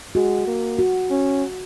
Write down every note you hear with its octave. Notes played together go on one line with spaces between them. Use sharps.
G#3 F#4
A#3
F#4
C#4